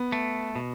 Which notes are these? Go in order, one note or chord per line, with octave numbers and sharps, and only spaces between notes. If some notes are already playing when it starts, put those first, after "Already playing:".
Already playing: B3
A3
B2